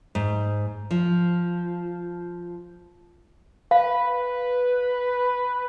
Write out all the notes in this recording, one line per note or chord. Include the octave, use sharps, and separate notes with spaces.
G#2
F3
B4 F5